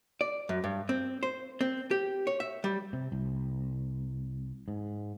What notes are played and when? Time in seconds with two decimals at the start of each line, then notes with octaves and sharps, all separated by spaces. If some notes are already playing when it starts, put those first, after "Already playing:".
0.21 D5
0.49 F#2
0.64 G2
0.89 C4
1.23 C5
1.61 C4
1.91 G4
2.27 C#5
2.40 E5
2.64 G3
2.93 C3
3.12 C2
4.68 G#2